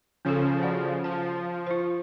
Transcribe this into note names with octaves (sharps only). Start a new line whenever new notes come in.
C#3 F3 C#4 A4
F#4 D5 F#5
F3 A5
F4 C5